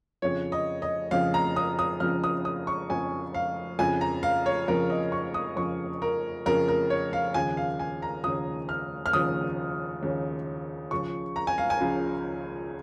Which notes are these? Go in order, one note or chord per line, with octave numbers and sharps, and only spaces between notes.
F2 C#3 F3 C#5
D#5
D#5
F2 C#3 F3 F5
A#5
D#6
D#6
F2 C#3 F3 F6
D#6
D#6
C#6
F2 C#3 F3 G#5
F5
F2 C#3 F3 G#5
A#5
F5
C#5
F2 C#3 F3 A#4
D#5
C#6
D#6
F2 C#3 F3 C#6
A#4
F2 C#3 F3 A#4
A#4
C#5
F5
D#2 C#3 F3 G#5
F5
G#5
A#5
D#2 C#3 F3 D#6
F6
F6
D#2 C#3 F3 D#6
D#2 C#3 F3
C#2 C#3 F3 C#6
A#5
G#5
F5
G#5
C#2 C#3 F3